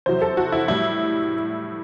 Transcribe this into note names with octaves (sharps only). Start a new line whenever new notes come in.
E2 C3 F#3 C5
A4
F#4
E4
A2 G3 E4